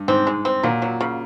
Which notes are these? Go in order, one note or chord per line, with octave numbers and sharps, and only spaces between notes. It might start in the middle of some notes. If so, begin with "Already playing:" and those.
Already playing: G2
G#2 C4
G#3
C4
A#2 F#3
F#3
C#3